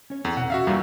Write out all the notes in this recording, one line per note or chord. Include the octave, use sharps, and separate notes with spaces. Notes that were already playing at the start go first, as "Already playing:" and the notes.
C#4 C#5
E2 C4 A4
B2 F#5
C#4 F#4 E5 F5
E2 G2 A#2 G3 A#4